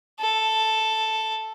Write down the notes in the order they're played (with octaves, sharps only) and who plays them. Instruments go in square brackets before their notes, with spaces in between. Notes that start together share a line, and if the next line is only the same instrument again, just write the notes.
[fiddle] A4